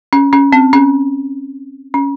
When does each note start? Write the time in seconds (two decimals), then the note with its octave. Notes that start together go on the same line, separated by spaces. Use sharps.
0.13 C#4
0.33 C#4
0.53 C4
0.73 C#4
1.94 C#4